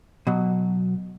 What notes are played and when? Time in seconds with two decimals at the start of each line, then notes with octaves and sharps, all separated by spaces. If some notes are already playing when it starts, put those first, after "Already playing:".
0.27 B2 F#3